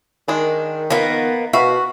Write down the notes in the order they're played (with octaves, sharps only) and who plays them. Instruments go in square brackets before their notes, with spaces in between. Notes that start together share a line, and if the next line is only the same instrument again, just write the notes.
[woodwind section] D#3 [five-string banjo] G#3 D4
[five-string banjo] F3 F5 [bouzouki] A#3 B3
[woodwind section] B2 [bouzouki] F#4 [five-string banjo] E5 F5 B5